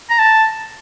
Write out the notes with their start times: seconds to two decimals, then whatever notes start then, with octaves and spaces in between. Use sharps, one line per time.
0.10 A#5
0.19 A5